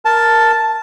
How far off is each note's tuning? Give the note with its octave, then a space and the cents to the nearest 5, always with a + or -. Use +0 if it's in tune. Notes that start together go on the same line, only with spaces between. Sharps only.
A#4 +0 A5 +0